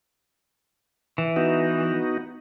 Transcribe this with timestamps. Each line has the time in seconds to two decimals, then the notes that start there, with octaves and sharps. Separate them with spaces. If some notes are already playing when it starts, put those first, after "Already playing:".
1.18 E3
1.36 B3 D#4 F#4